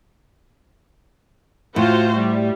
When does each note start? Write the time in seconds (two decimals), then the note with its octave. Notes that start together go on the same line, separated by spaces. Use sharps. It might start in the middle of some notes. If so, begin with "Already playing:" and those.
1.76 A2 F4 F#4 C5
2.16 G3